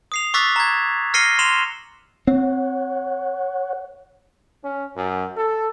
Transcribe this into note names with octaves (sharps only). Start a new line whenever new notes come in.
D#6 C7 F7
C#6 D6 E6 F#6 A6 B6
A#5 G#6
F6 A#6 C7 C#7 D#7 G7
C6 E7 F7 G7
C4 C#5 F#5
C#4
F#2
A4